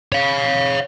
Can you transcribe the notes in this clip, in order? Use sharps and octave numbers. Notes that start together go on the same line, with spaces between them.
C#5 F5